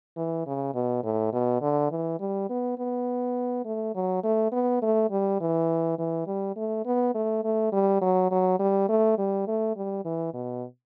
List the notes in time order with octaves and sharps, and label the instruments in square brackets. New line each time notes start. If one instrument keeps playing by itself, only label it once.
[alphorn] E3
C#3
B2
A2
B2
D3
E3
G3
B3
B3
A3
F#3
A3
B3
A3
G3
E3
E3
G3
A3
B3
A3
A3
G3
F#3
F#3
G3
A3
G3
A3
G3
E3
B2